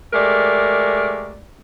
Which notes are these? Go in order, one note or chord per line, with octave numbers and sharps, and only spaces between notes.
G#3 A3 G4 A#4 D5